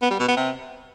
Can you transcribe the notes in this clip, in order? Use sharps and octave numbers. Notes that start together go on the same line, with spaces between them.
B3
G3
B2
B3
C3